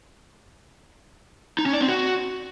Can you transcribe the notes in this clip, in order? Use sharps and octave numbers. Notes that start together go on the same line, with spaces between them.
D#4
C#4
D5
C4
F#4